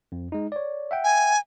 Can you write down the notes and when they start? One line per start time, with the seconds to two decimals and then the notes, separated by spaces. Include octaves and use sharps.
0.12 F2
0.32 G#3 D#4
0.52 C#5 D5
0.91 E5 F#5 G5
1.04 G#5